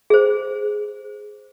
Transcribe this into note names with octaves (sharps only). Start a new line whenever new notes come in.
G#4 C5